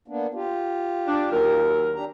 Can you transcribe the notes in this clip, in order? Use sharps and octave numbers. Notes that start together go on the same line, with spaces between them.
A#3 B3 D4
F4 G4
D4
D#2 F#3 A#4
D4 G4 A#5